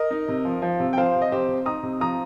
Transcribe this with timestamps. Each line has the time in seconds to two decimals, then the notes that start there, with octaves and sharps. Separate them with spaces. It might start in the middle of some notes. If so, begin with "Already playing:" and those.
Already playing: A#4 D#5
0.11 D#4
0.28 C3
0.45 F3
0.62 F3
0.80 C3
0.93 G5
0.97 F3 C5 F5
1.15 C3
1.22 D#5
1.32 C3 G4 C5
1.48 C3
1.66 D#4 A#5 D#6
1.83 C3
2.00 F3 A#5 D#6